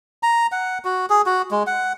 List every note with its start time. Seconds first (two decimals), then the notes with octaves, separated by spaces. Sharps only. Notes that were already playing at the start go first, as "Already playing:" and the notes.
0.23 A#5
0.52 F#5
0.85 F#4
1.10 G#4
1.26 F#4
1.51 G#3
1.67 F#5